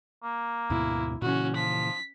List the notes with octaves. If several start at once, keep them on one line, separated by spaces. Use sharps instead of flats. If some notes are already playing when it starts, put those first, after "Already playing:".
A#3
D2 G#2 B2 E4
A#2 C#3 E3 C#4 F#4
F3 B6